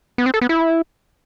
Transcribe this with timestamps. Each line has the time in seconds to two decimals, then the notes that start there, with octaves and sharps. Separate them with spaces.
0.18 B3
0.26 C4
0.34 A4
0.42 B3
0.49 E4